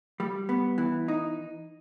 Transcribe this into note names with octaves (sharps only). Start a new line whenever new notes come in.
G3
B3
E3
D#4